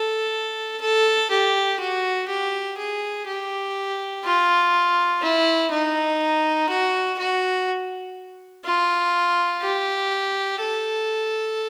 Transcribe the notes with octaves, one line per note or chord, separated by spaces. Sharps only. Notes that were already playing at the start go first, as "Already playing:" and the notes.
Already playing: A4
A4
G4
F#4
G4
G#4
G4
F4
E4
D#4
F#4
F#4
F4
G4
A4